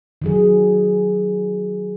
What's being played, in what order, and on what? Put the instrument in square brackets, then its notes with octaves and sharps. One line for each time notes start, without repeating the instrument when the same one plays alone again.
[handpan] D#3 F#3 G#4